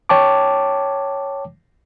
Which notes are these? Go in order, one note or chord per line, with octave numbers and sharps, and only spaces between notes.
C#5 G5 A5 D6